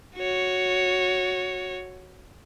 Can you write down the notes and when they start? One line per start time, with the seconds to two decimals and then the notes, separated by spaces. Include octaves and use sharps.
0.17 F#4 C#5